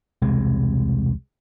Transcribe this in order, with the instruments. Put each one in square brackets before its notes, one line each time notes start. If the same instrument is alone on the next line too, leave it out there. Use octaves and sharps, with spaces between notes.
[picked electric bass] E1 C2 C3 G#3